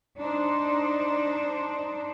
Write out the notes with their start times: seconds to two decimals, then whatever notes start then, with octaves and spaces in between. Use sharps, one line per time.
0.19 D4 D#4 C5